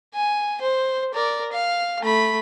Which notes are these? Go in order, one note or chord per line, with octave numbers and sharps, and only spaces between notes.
G#5
C5
A#4 D5
F5
A3 B5